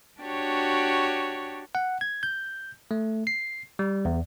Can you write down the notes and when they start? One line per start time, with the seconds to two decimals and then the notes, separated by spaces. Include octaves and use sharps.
0.21 D4 F#4 G4 C#5
1.75 F#5
2.01 G#6
2.23 G6
2.91 A3
3.27 C7
3.79 G3
4.05 E2